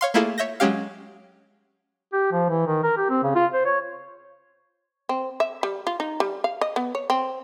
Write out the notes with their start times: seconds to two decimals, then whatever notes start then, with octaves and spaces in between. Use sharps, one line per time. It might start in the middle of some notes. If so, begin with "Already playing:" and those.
0.01 C#5 F5 C6
0.14 A3 A#3 E4 F4 G#4 A4
0.38 C#5 E5 G6 A#6
0.60 F#3 G#3 C#4 G4 F5
2.13 G4
2.32 F3
2.49 E3
2.67 D#3
2.83 A#4
2.97 G4
3.10 C4
3.23 C#3
3.35 F4
3.53 C5
3.66 C#5
5.09 C4
5.40 E5
5.63 G3
5.87 F4
6.00 D#4
6.20 G3
6.44 F5
6.61 D#5
6.76 B3
6.95 C#5
7.10 C4